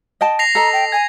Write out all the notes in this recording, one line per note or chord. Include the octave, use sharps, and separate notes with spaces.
D#5 G5 A5
A#6 C7 F7
A4 D#5 A#5
G5
G#5 G#6